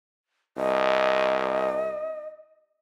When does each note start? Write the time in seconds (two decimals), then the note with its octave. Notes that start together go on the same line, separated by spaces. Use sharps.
0.57 C2 D#5